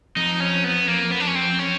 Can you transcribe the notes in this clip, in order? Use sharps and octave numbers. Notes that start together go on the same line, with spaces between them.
F2 D#4
C#4
B3
A#3
B3
D4
C#4
C4
C#4